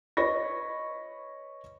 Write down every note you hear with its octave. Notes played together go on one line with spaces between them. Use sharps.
B4 C#5 D#5 B5 C#6 A#6